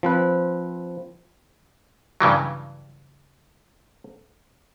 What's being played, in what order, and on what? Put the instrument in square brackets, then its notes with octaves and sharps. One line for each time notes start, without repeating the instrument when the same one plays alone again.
[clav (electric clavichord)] F3 C4 B4
G2 C#3 E3 F#3